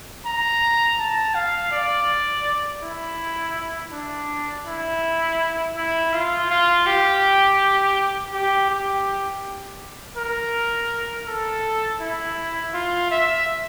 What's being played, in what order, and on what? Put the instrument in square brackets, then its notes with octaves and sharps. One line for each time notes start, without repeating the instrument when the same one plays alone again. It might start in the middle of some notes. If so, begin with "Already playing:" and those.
[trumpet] A#5
A5
F5
D5
E4
D4
E4
E4
F4
F4
G4
G4
G4
A#4
A4
E4
F4
E5